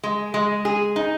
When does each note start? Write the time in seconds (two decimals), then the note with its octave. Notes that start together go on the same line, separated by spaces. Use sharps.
0.03 G#3
0.34 G#3
0.65 G#4
0.96 D#4